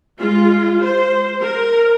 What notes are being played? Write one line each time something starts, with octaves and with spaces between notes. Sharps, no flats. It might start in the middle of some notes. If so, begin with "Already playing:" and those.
G#3 F4
C5
A#4